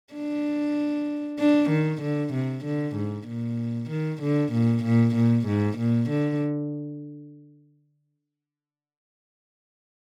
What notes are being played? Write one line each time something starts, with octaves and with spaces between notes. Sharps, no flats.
D4
D4
D#3
D3
C3
D3
G#2
A#2
D#3
D3
A#2
A#2
A#2
G#2
A#2
D3